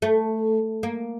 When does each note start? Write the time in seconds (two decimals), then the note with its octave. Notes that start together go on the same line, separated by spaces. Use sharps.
0.02 A3
0.83 A#3